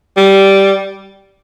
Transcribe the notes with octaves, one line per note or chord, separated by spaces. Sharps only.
G3